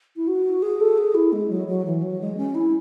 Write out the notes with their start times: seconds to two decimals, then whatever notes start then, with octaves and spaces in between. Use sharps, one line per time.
0.16 E4
0.27 F#4
0.62 G#4
0.80 A4
0.98 G#4
1.15 E4
1.32 G#3
1.50 F#3
1.68 F#3
1.85 E3
2.02 F#3
2.21 G#3
2.37 C#4
2.55 E4